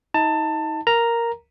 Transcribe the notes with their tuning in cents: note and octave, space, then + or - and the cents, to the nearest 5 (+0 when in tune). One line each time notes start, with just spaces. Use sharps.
D#4 +35 A5 +20
A#4 +0 A#5 +0